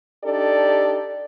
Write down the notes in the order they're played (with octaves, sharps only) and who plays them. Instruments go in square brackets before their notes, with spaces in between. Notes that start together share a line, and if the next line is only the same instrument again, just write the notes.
[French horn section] D4 D#4 G4 A4 D5